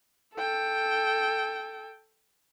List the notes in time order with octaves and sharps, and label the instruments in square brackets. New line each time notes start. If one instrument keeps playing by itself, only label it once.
[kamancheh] A4 G5